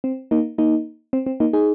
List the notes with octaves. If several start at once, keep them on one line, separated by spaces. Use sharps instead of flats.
C4
A#3 D#4
A#3 D#4
C4
C4
A#3 D#4
D#4 G#4